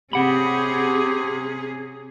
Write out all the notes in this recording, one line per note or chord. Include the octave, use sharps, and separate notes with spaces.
C3 C4 C#4 G4 G#4 F#5 B5